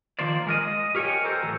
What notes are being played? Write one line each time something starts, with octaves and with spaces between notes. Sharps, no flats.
D#3 F3 A#3 C5 D5
G#3 A#4 D#5
D#5
G4 A#4 C#5 D#5 G5 G#5
A4 A#4 C5
A2 E3 F#3